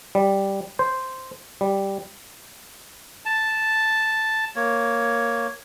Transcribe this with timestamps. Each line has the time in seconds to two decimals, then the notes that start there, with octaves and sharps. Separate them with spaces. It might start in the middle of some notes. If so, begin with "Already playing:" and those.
0.15 G3
0.79 C5
1.61 G3
3.26 A5
4.56 A#3 C#5